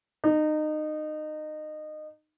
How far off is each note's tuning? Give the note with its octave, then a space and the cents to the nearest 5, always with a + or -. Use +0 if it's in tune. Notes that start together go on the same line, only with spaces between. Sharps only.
D#4 -25